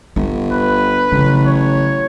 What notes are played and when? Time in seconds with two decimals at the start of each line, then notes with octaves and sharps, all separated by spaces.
0.16 G1 D4
0.52 B4
1.12 A1 C#3 F#3
1.45 C#5